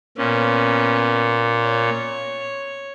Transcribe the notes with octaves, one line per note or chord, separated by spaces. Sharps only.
A#2 B3 C#4
C#5